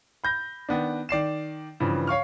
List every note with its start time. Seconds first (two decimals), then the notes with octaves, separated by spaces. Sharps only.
0.24 B5 G6 A#6
0.69 D#3 B3 D4
1.09 D#3 D5 C7 E7
1.80 G2 C#3 E3 F3
2.07 C#5 F5 C#6 F6